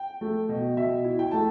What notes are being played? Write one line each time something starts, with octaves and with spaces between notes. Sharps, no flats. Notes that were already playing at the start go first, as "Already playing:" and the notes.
Already playing: G5
A3
B2
B2 E5
E4
G5
A3 A5